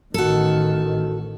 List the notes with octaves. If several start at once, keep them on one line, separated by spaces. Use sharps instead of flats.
A1 D#3 F#4 A4